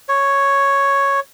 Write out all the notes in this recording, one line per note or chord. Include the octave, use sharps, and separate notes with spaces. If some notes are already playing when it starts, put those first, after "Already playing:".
C#5